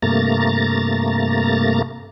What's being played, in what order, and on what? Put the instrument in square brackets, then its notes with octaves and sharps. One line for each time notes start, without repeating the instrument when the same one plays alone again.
[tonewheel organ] G2 C3 A3 A#3 A#5 A6